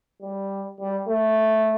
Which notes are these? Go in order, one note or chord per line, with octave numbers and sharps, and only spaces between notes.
G3
G3
A3